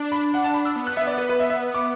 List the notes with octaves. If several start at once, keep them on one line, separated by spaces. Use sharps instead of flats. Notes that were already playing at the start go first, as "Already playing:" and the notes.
Already playing: D4
B5
F#5
A5
B5
E6
B3
F#6
E5
D5
B4
B4
E5
E5
D6